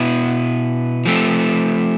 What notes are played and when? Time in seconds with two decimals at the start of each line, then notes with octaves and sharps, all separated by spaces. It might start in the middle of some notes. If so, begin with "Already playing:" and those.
Already playing: B2 B3 E4
1.06 F3 A3 C4